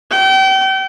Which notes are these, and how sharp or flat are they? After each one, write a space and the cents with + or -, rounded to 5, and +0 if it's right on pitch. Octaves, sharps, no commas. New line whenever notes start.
G5 -35